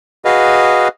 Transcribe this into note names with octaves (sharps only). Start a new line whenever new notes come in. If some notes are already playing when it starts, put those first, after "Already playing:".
F#4 G#4 B4 D#5 F5